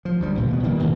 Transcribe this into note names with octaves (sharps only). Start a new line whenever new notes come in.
F3
D2 G3
C2 A#2 E3
B2 A3 B3
D#3 E3 G3 A#3
E1 A1 A#2